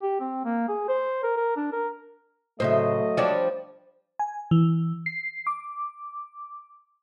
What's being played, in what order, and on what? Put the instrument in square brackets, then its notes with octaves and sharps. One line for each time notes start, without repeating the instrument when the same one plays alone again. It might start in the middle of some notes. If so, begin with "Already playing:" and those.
[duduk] G4
C4
A#3
G#4
C5
A#4
A#4
D4
A#4
[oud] A2 C#3 [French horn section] F#3 A3 [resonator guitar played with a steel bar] C5 E5 [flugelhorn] D#5
[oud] F3 G3 D4 [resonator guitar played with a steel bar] C#5 D5
[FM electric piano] G#5
E3
C7
D6